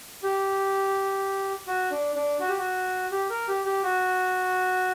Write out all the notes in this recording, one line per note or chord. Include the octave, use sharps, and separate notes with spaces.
G4
F#4
D4
D4
F#4
G4
F#4
G4
A#4
G4
G4
F#4